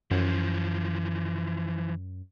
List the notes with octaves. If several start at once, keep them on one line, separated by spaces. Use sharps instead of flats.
F#2 E3 F3